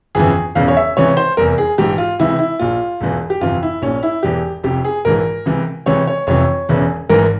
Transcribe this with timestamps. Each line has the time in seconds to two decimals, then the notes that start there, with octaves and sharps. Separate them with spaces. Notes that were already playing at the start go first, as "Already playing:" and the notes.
0.15 G1 F2 C#3 E3 G#4
0.55 E1 E2 C#3 E3 F5
0.68 C#5
0.77 E5
0.97 C#2 C3 E3 C#5
1.17 C5
1.37 F1 E2 E3 A#4
1.58 G#4
1.78 A#1 G#2 E3 G4
1.98 F4
2.19 C#2 C3 E3 E4
2.39 E4
2.59 A#1 A#2 F4
3.01 E1 E2 E3
3.30 G4
3.41 G1 F2 C3 E3 F4
3.63 E4
3.82 A#1 A#2 C#4
4.03 E4
4.23 E1 E2 E3 G4
4.64 F1 F2 C3 G4
4.84 G#4
5.05 A#1 G#2 E3 A#4
5.46 C#2 C3 E3
5.86 C#2 C3 E3 C#5
6.08 C#5
6.27 F1 F2 C3 E3 C#5
6.69 E1 E2 C#3 E3
7.09 G#1 G#2 E3 A#4